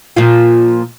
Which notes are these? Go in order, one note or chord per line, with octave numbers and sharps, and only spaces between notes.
A#2 F3 F4